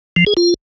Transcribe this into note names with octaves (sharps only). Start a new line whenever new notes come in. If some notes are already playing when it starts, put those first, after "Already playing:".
F3
G#4
F4